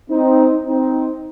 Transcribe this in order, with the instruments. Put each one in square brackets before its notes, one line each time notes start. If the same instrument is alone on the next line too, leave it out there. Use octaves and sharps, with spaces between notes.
[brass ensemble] C4 D#4
C4 D#4